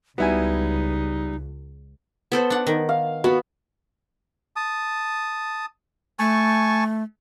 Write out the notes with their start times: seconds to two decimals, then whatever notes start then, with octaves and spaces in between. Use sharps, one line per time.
0.18 C#2 G3 B3 D#4 E4 F#4 G#5
2.32 B3 A4 C5
2.50 D4 F#5
2.67 D#3
2.89 F5
3.24 B3 F#4 B5
4.56 A5 D#6
6.19 A3 G#5 A5 C#6